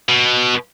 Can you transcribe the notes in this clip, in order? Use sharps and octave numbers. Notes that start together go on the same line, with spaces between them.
B2